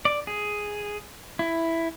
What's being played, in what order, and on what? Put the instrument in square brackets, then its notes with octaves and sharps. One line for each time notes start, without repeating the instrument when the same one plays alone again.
[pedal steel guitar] D5
G#4
E4